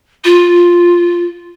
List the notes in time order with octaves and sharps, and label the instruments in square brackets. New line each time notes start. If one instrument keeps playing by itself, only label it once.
[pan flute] F4